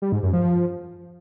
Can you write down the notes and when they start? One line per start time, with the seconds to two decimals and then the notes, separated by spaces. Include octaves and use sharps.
0.02 G3
0.12 G#2
0.23 F#2
0.33 F3